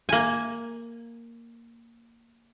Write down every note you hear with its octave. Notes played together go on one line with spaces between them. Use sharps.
A#3 G#5